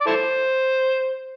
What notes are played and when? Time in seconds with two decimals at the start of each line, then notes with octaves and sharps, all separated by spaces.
0.01 D5
0.06 E4 A4 C5